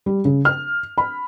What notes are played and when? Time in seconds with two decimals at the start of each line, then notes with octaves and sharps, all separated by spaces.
0.06 G3
0.25 C#3
0.45 F6
0.98 B5